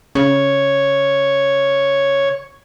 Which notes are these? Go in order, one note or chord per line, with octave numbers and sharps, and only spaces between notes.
C#3 C#5